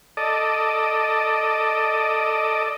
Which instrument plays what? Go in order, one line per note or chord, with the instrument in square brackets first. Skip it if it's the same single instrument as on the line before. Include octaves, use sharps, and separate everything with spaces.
[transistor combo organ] A4 D5 D#5